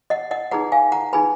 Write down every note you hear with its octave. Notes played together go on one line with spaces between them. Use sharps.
D#5 F#5
D#5 F#5
D#4 G#4 B4 F#5 A#5
F5 G#5
F#5 A#5
D#4 G#4 B4 G#5 B5